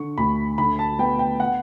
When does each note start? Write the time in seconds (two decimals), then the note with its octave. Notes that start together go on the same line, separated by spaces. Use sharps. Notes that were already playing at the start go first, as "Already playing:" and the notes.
Already playing: D3 C#6
0.18 D2 B5
0.58 D3 B5
0.79 A5
0.99 B3 G5
1.19 G5
1.40 F#5